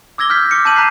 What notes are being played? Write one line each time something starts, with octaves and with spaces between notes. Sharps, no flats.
D6 E6 G#6 A#6 G7
F6 G6 B6
D6 F6 C#7
A5 D6 G6 C#7 D#7 F#7
A#5 F#6 B6 C7